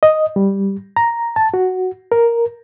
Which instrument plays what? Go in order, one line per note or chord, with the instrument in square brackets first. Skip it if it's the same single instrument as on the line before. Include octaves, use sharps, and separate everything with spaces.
[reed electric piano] D#5
G3
A#5
A5
F#4
A#4